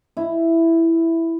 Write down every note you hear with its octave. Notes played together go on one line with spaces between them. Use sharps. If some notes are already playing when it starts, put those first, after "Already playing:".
E4